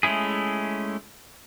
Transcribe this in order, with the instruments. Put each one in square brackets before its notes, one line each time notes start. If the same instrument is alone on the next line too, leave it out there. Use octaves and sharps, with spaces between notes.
[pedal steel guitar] G#3 A3 C#4 E4 G#4